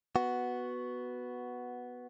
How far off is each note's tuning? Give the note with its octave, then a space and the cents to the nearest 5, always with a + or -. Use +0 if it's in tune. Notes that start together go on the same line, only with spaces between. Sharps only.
B3 +0 F#4 +0